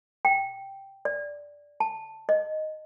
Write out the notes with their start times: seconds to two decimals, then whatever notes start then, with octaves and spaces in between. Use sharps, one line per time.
0.25 G5
1.05 D5
1.80 A5
2.29 D#5